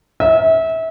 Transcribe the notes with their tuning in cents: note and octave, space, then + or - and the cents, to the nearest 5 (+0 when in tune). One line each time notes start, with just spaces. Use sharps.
E5 -30